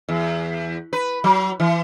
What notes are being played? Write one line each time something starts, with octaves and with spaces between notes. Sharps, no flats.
E2
B4
F#3
E3